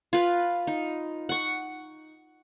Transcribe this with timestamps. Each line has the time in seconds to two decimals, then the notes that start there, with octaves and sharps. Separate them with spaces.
0.13 F4 B4
0.67 D#4
1.29 F#5 C#6